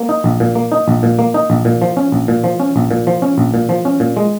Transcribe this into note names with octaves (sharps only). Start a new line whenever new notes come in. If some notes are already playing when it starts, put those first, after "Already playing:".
Already playing: A#3
D#4
A#1
A#2
A#3
D#4
A#1
A#2
A#3
D#4
A#1
A#2
F3
C#4
A#1
A#2
F3
C#4
A#1
A#2
F3
C#4
A#1
A#2
F3
C#4
A#2
G#3